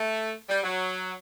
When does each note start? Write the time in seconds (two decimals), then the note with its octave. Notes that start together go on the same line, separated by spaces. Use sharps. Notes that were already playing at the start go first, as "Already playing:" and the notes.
Already playing: A3
0.49 G3
0.64 F#3